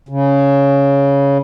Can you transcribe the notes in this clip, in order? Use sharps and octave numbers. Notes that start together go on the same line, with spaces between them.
C#3